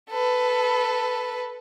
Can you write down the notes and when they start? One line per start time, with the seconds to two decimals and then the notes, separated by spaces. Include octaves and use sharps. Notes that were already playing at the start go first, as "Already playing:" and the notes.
0.10 A4 B4